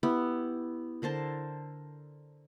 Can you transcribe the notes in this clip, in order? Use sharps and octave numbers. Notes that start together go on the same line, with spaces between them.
B3 E4 G4
D3 A#4 C5 A5